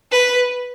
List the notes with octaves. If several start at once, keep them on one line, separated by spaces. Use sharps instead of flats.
B4